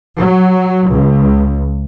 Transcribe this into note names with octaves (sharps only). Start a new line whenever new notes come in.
F#3
C#2